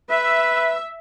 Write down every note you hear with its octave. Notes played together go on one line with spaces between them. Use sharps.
B4 E5